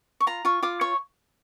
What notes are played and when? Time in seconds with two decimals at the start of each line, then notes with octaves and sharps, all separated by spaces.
0.20 C#6
0.27 F4 A#5
0.45 F4 C#6
0.63 F4 D6
0.81 C#5 C#6